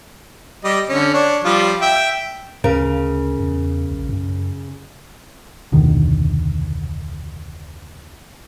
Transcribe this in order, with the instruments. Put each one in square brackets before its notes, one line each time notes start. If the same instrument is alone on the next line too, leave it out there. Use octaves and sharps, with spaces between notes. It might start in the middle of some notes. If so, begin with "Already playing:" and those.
[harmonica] G3 D#5
D3 C#4
D4 C#5
F3 G3 F4
E5 G5
[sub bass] D2 [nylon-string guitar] C#3 A#4
[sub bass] E2
A#1
F#2
[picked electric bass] F1 D2 B2 D#3